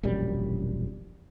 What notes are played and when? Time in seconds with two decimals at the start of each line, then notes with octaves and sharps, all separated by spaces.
0.03 E1 A#1 F#2 G3